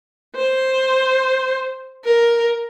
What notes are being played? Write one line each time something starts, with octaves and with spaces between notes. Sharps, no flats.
C5
A#4